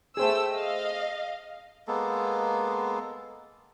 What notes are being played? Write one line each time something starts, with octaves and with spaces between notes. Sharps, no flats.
A3 G#4 C5 G5 E6
D#5 F5
G#3 A#3 B3 A4